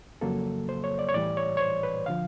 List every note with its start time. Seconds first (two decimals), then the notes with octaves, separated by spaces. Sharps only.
0.21 F2 C#3 F#3 A#3 A4
0.69 C5
0.84 C#5
0.99 D5
1.09 C#5
1.14 A2 E3 G3 D5
1.37 C#5
1.57 C#5
1.60 C5
1.83 B4
2.06 D3 F3 F5